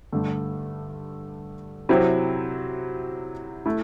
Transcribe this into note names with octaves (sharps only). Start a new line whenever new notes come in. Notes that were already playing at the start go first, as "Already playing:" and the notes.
G2 D3 A3
C3 F#3 C4 E4
A3 E4